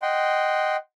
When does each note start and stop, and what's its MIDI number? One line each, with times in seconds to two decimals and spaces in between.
0.02 0.76 75
0.02 0.76 78
0.02 0.76 79
0.02 0.76 84